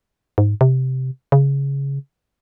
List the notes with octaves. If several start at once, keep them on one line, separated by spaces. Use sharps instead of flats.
G#2
C3
C#3